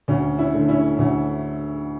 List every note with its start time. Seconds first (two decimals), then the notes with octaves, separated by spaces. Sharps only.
0.08 D2 C#4
0.38 C#4 E4
0.54 D3 A3
0.68 C#4 E4
0.98 D2 C#4